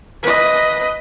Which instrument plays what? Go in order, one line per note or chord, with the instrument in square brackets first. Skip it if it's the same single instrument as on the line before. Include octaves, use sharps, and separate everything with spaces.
[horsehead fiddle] B4 D#5